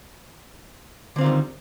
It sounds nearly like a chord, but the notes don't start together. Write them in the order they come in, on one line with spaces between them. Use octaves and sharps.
D3 C4 F4 D#3 G3